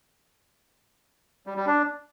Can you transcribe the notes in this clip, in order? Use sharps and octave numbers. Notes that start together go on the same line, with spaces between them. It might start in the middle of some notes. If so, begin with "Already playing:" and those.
G3
G3
D4